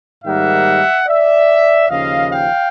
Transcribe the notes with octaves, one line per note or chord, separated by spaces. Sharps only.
G#2 D#3 G3 A#3 E5 F#5
D5 E5
D#2 C#3 F3 D#5 F5
F5 G5